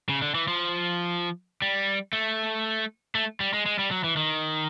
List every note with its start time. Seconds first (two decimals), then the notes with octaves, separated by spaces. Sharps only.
0.09 C#3
0.22 D3
0.35 E3
0.48 F3
1.62 G3
2.13 A3
3.15 A3
3.40 G3
3.54 G#3
3.66 G#3
3.79 G3
3.91 F#3
4.04 E3
4.17 D#3